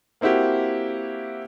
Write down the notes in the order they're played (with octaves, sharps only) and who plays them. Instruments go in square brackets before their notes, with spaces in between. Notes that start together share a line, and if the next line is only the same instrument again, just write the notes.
[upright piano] A#3 C4 E4 F#4 G4